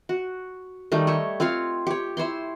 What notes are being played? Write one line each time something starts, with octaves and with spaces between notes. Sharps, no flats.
F#4
D#3 G3 A3 D#4
C#5 D#5 E5
C4 F4 C#5 F5
G4 C#5
E4 C5 C#5 C6